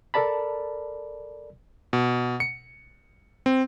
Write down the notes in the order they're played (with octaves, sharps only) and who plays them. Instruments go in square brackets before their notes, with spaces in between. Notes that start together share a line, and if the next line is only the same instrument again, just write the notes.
[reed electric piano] A4 A#4 D5 A5 B5
[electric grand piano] B2
C#7
C4